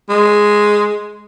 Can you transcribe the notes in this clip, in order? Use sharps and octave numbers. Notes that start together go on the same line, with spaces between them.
G#3